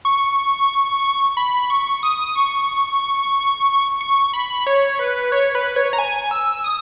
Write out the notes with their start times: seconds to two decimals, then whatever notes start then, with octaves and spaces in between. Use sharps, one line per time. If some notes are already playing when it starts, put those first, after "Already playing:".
0.05 C#6
1.37 B5
1.70 C#6
2.03 D#6
2.35 C#6
4.01 C#6
4.34 B5
4.67 C#5
4.99 B4
5.32 C#5
5.55 B4
5.76 C#5
5.93 A#5
5.98 G#5
6.31 E6
6.64 D#6